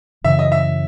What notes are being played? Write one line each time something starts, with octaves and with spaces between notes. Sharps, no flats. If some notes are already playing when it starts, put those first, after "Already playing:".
F#2 C#3 E3 E5
D#5
E5